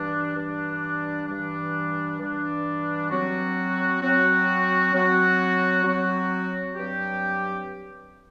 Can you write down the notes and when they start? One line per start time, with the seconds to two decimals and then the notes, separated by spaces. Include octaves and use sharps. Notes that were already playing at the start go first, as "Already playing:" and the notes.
Already playing: G2 E3 G3 D4
0.35 G2 E3 G3 D4
1.27 G2 E3 G3 D4
2.19 G2 E3 G3 D4
3.10 F#3 C4 F#4
4.01 F#3 C4 F#4
4.93 F#3 C4 F#4
5.84 F#3 C4 F#4
6.76 G2 F#3 C4 G4